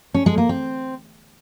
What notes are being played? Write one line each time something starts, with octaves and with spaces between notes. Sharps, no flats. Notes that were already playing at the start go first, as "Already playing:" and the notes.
C#4
G#3
A#3
C4